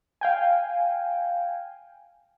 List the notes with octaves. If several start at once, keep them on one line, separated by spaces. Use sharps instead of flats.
F5 G5 G#5